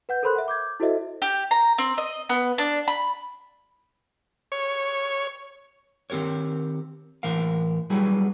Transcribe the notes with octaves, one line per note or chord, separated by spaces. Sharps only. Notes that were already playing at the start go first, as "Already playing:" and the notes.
B4 F#5 G6
A4 A#4 C5 B5 C6 F#6
E5 F#5
D6 G6 G#6
E4 F#4 A4 C5 D#5 E5
G4
A#5
C4
D#5
B3
D4
B5
C#5
D#3 C4 G4 A#4 C#5
A2 E3 A#4 F5
F#3 G3 E4 G#4 B4